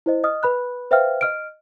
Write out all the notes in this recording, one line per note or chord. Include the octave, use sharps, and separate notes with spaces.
E4 C5 D#5
D#5 D#6 F6
B4 B5 F#6
B4 C5 E5 F5 G5 F6
D#5 F6 D7